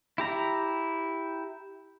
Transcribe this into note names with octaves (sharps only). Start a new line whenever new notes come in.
E4 G4 A#5